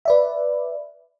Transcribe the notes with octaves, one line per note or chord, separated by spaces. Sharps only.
B4 D5 E5